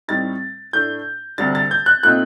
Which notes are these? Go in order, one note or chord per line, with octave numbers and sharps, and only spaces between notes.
A2 G3 C4 D#4 A6
A2 A3 D4 G6
D2 C3 G3 D4 A6
A6
G6
F#6
A#2 A3 C4 D#4 F#6